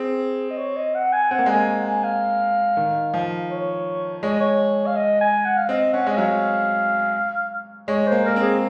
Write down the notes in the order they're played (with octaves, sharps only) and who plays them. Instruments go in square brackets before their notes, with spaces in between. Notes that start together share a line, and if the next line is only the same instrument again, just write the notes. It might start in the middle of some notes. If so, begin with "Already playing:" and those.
Already playing: [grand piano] C4 [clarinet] G#4
[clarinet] D#5
C#5
D#5
F#5
G#5
[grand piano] C4 [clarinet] F#5
[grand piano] A#3
[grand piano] G#3 [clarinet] G#5
[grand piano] A#3
[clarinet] F#5
G#5
F5
[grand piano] D#3
F3
[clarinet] C#5
[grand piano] G#3 [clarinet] C#5
[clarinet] D#5
C#5
F5
D#5
G#5
F#5
F5
[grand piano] C4 [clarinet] D#5
[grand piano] C#4 [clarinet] F#5
[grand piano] G#3 [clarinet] D#5
[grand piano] F#3 [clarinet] F5
[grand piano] G#3 [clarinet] C#5
[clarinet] C5
[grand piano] A#3
[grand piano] A#3 [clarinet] A#4
[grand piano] C4
[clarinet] G#4